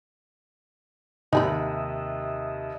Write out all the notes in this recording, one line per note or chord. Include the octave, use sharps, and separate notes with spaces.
D#2 C3 D#4 D#5 E5 G#5 B5